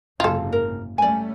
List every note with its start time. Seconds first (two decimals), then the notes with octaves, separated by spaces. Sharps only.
0.20 F#1 G#2 C3 F4 A4
0.52 A#4
0.98 G3 A3 C#4 D5 G#5